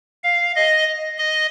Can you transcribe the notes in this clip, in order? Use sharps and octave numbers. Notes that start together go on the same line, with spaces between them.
F5
D#5
D#5